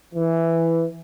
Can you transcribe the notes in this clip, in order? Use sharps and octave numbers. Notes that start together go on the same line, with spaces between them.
E3